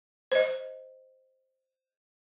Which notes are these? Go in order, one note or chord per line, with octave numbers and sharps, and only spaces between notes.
C5 D#5